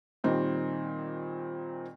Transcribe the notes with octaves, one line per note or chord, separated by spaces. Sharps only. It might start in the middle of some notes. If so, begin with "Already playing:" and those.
A#2 D#3 G3 C4 D#4